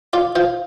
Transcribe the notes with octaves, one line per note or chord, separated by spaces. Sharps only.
F4 D5
F4 C5